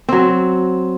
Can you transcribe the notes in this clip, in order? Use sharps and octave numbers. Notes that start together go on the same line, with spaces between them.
F#3 C4